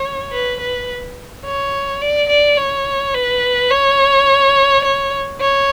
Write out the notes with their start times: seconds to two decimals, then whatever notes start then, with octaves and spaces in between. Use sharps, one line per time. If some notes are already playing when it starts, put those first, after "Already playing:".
Already playing: C#5
0.32 B4
0.61 B4
1.46 C#5
2.02 D5
2.29 D5
2.58 C#5
3.14 B4
3.71 C#5
4.85 C#5
5.41 C#5